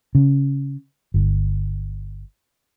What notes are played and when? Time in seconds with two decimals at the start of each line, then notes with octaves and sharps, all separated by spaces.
0.15 C#3
1.14 G1